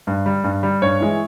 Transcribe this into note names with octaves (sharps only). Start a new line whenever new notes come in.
G2
G3
G2
G3
G2 C#5
E3 G#3